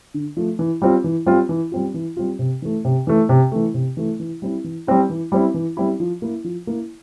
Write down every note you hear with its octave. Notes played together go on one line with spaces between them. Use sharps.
D3
F3 A3
E3
G3 C4 F4
E3
G3 C4 F4
E3
G3 C4 F4
E3
G3 C4 F4
C3
E3 A3
C3
E3 A3
C3
E3 A3
C3
E3 A3
E3
G3 C4 E4
E3
G3 C4 E4
E3
G3 C4 E4
E3
G3 C4 E4
F3
A#3 E4
F3
A#3 E4